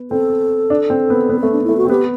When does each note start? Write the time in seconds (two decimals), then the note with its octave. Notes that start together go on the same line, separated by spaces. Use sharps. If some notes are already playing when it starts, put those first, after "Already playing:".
Already playing: B3
0.11 C4 A4
0.70 D4
0.90 C4
1.10 B3
1.29 B3
1.39 A3 C4
1.52 D4
1.64 A3 E4
1.77 F#4
1.85 C4
1.89 B3 G4